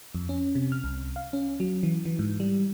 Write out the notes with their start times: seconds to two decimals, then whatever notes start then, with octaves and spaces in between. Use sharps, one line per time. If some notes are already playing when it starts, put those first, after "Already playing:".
0.15 F2
0.29 C#4
0.55 C3
0.72 F6
0.84 C2
1.16 F5
1.33 C#4
1.60 F#3
1.83 E3
2.05 E3
2.19 G#2
2.40 G3